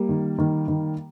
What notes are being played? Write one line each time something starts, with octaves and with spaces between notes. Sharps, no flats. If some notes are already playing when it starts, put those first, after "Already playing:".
Already playing: G3 A#3
D#3
D#3
D#3